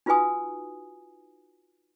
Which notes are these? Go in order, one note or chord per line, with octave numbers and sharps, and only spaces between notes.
D#4 F4 F#4 B4 G#5 D#6